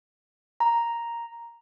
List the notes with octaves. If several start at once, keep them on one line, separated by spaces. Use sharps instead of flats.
A#5